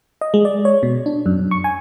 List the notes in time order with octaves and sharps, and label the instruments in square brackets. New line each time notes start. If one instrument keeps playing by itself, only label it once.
[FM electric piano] D#5
G#3
D5
C#5
B2
D4
F#2
F#2
C#6
G#5